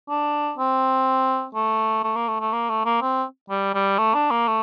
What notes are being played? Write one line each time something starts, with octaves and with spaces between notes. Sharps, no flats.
D4
C4
A3
A3
A#3
A3
A3
A#3
A3
A#3
C4
G3
G3
A3
D4
A#3
A3